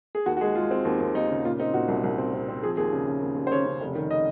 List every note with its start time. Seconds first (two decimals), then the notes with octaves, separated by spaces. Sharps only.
0.15 G#4
0.26 D#2 F#4
0.37 F#4
0.41 G#3 G#4
0.55 G#3 F4
0.71 C4
0.85 D#2
1.00 D#2
1.15 D#2 D#4
1.30 C#3
1.44 A#2 F4
1.60 C4 D#4
1.74 A#2 F#4
1.88 C2
2.04 C2
2.18 C4
2.34 C4
2.49 C4
2.63 F3 G#4
2.77 D#2 G#4
2.93 C#3
3.07 C#3
3.21 D#2
3.36 D#2
3.47 C5
3.51 C#3 C#5
3.66 C#3
3.80 F1
3.95 D#3
4.11 D#5